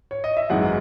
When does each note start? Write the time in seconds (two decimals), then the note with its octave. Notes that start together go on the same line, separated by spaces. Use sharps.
0.11 C#5
0.24 D#5
0.37 E5
0.50 G#1 F#2 E3 G#3 D#4 F#5